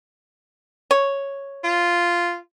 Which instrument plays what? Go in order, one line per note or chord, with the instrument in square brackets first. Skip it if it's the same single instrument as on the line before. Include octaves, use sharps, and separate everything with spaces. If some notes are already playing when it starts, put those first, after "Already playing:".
[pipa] C#5
[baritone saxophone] F4